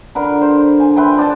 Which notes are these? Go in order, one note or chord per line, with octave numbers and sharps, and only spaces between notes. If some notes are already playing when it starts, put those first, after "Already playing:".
D3 A#4 B4
C5
G#5
B4 E5 G5 C6
D4 A4 A5